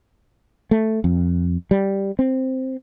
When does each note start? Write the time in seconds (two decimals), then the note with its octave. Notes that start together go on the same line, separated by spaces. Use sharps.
0.71 A3
1.04 F2
1.71 G3
2.19 C4